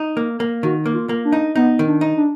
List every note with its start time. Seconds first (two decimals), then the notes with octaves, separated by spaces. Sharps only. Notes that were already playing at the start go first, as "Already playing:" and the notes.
Already playing: D#4
0.17 A#3
0.40 A#3
0.63 D#3 F#4
0.86 A#3
0.94 F4
1.09 A#3
1.25 D4
1.32 D#4
1.56 B3 D#4
1.79 D#3
1.87 D4
2.01 D#4
2.17 D4